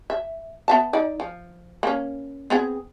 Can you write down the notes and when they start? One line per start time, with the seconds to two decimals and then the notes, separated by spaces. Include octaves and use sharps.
0.10 E5
0.68 B3 E5 A5
0.93 D#4 D5
1.20 F3
1.83 A#3 C#4
2.50 B3 C4 G#4